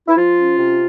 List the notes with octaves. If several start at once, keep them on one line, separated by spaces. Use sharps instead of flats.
E4
F3 F4
C#4
C3